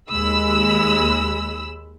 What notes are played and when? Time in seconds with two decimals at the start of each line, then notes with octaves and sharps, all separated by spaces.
0.11 D#2 G#3 B5 E6